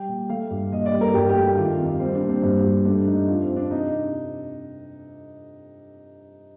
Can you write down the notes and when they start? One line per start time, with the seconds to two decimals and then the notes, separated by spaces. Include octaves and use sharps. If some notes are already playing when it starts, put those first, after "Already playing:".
Already playing: G3 G5
0.08 A#2
0.29 A3 F5
0.50 G2
0.72 A#2 D#5
0.86 D5
0.93 G3
1.01 A#4
1.14 G2 G4
1.29 G4
1.36 A3
1.48 G4
1.57 D#3 F4
1.78 F2
2.00 G3 C4
2.15 D4
2.22 A#2
2.29 C4
2.42 G2 C4
2.64 G2
2.85 A3 D4
3.07 A3 D#4
3.28 F2 F4
3.43 C4
3.49 F2
3.56 D4
3.70 C3 D#4